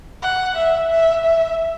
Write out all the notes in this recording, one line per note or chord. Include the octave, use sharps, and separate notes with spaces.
F#5
E5
E5
E5